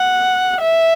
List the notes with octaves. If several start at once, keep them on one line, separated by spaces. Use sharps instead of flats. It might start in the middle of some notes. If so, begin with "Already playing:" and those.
Already playing: F#5
E5